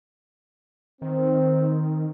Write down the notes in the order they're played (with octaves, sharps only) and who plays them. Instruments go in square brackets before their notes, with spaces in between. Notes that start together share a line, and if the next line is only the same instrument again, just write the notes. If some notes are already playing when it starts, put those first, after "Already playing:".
[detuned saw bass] D#3 [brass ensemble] C4